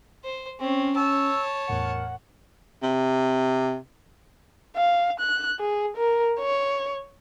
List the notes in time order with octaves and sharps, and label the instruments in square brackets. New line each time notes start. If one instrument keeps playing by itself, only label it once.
[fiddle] C5
[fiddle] C4 C#5 [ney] C#4
[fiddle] C#5 A5 [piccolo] E6
[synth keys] E2 A2 C#7 [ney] A#4 [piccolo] F#5
[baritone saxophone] C3
[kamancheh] F5
F#6
G#4
A#4
C#5